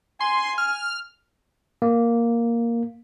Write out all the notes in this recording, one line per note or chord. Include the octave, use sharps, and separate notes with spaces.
G#5 C6
F6
A#3